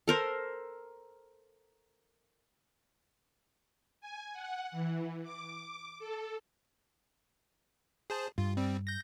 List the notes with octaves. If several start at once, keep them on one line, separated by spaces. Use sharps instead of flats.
A4 A#4 C5
G#5
F#5
E3
D6
D6
A4
G#4 C5 A5
G2 F4
G3 C4
G6 A#6